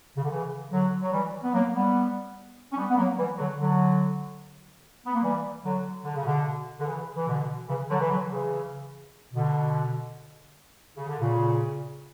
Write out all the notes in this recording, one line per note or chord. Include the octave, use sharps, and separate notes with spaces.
C#3
D3
C#3 E3
D3 F#3
F#3
E3 G3
B3
F#3 A#3
G3 B3
C#4
G3 B3
B3
F#3 A#3
E3 G3
D3 F#3
D3 F#3
B3
A#3
E3 G3
D3 F#3
D3
C#3
B2 D3
D3
C#3 E3
E3
B2 D3
C#3 E3
D3 F#3
E3
D3 F#3
C#3 E3
B2 D3
C#3
D3
A#2 C#3